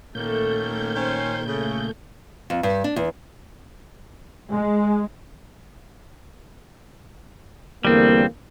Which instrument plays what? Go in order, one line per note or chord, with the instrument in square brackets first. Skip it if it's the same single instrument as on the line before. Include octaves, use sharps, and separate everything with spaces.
[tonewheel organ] A#2 G6 [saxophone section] D#3 A#3 C#4 [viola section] A3
[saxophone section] D#3 C#4 [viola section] C5
[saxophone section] C#3 [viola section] A3
[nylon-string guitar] F2
G2
D4
E2
[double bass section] G#3
[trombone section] E2 D3 A#3 [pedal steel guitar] G3 C4